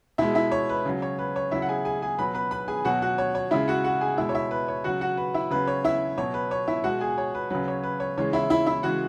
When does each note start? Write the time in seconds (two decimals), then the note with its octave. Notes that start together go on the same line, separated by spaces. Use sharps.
0.18 B2 G#3 E4 E5
0.35 E4 E5
0.52 C#5
0.69 B4
0.85 C#3 F#3
1.02 C#5
1.19 B4
1.36 C#5
1.51 C#3 F#3 E4 E5
1.62 F#5
1.69 G#4 G#5
1.85 G#4 G#5
2.02 G#4 G#5
2.18 B2 F#3 B4 B5
2.35 B4 B5
2.51 B4 B5
2.68 G#4 G#5
2.85 B2 F#3 F#4 F#5
3.02 F#4 F#5
3.18 C#5
3.35 C#5
3.51 C#3 G#3 E4 E5
3.68 F#4 F#5
3.84 F#4 F#5
4.01 G#4 G#5
4.18 B2 G#3 E4 E5
4.29 C#5
4.34 E4 E5
4.51 B4
4.68 C#5
4.84 C#3 F#3 F#4 F#5
5.01 F#4 F#5
5.17 B4
5.34 E4 E5
5.50 C#3 F#3 B4
5.67 C#5
5.84 E4 E5
6.17 B2 F#3 C#5
6.34 B4
6.51 C#5
6.68 E4 E5
6.84 B2 G#3 F#4 F#5
7.00 G#4 G#5
7.18 C#5
7.35 B4
7.50 C#3 F#3 B4
7.68 C#5
7.83 B4
8.00 C#5
8.18 C#3 E3 G#3 C#5
8.33 E4 E5
8.50 E4 E5
8.66 E4 E5
8.83 C#3 E3 G#3 F#4 F#5